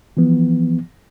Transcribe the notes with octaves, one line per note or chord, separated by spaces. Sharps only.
E3 F3 B3